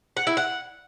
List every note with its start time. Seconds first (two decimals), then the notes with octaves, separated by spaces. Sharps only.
0.17 F#5
0.27 E4
0.37 F#5